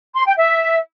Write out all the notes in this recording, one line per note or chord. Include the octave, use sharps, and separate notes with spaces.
C6
G5
E5